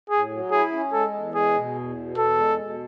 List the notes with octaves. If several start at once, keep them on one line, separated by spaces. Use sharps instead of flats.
A2 G#4
F#3
E4 G#4
C#4
G#3 A4
E2
G#3 G#4
B2
E2
B2
E2 A4
G#3
B2